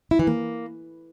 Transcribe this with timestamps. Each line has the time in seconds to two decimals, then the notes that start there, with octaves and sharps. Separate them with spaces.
0.11 E4
0.19 E3
0.27 A#3